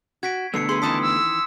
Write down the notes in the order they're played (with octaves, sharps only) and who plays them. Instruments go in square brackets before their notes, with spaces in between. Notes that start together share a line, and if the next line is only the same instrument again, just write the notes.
[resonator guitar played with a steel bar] F#4 [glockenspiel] G#6 B6 D7
[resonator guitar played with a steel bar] B2 [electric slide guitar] D3 A3 B3 [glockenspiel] E6 C7 C#7
[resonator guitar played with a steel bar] G#4 B4 [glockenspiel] C6
[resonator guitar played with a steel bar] D#3 E3 C#4 [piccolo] A5 [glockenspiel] D#6 B6
[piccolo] E6